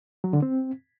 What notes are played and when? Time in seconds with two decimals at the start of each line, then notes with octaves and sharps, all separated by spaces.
0.24 F#3
0.33 D3
0.42 C4